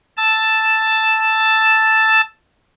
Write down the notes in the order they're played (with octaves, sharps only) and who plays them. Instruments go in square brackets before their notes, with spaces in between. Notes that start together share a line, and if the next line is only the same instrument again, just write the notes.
[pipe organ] A5 E6